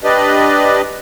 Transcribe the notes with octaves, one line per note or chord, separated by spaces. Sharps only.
D4 G4 B4 D5 D#5